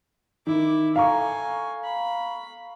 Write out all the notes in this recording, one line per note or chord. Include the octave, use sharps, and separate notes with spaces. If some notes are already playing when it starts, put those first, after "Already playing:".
D#3 E4 D6
A4 F5 G#5 A#5 C#6
B5